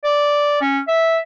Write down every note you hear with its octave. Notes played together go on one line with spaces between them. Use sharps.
D5
C#4
E5